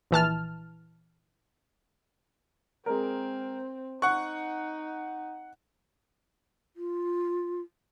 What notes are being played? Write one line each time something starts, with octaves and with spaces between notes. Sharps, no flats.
A#1 E3 A5 F6
G#3 C4 A#4
D#4 F#5 C#6 F#6
F4